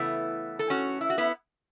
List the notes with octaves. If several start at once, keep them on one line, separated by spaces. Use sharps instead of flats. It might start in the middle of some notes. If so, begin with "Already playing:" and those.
Already playing: C#3 E3 A3 B3 E4
A4
C#4 F#4
E4
F#4
B3 E4